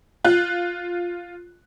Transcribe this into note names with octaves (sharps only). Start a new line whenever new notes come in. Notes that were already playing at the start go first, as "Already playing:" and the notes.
F4 F#6